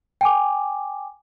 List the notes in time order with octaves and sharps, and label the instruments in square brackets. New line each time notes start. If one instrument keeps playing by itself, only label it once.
[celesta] G5 G#5 D6